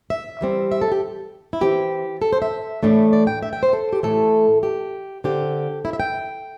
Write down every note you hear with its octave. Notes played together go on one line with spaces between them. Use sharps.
E5
E3 G3 C4
E5
A4
G4
E4
E3 C4 G4
A4
C5
E5
A2 E3 A3 D4
D5
G5
E5
G5
C5
A4
G4
A2 E3 A3 A4
G4
D3 C4 G4
E4
E5
G5